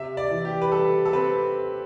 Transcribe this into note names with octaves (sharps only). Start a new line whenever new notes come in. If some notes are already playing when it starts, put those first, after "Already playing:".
Already playing: C3 E5
D5
E3
G4
B4
G3 A4
A4
C4 B4